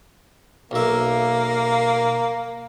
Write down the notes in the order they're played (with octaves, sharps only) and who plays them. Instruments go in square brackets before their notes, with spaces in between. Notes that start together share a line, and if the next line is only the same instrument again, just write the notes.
[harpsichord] B1 E5 [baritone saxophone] A#3